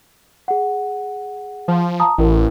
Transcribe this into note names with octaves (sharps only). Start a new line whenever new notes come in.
G#4 F#5
F3
A5 A#5 D#6
A1 E4 A#4